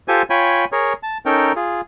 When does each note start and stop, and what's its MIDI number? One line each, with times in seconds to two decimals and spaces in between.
0.08 0.22 65
0.08 0.22 67
0.08 0.22 69
0.08 0.22 72
0.08 0.22 80
0.30 0.65 65
0.30 0.65 73
0.30 0.65 79
0.30 0.65 80
0.30 0.65 83
0.72 0.93 68
0.72 0.93 70
0.72 0.93 73
1.03 1.18 81
1.26 1.52 61
1.26 1.52 63
1.26 1.52 69
1.26 1.52 70
1.26 1.52 79
1.56 1.81 65
1.56 1.81 68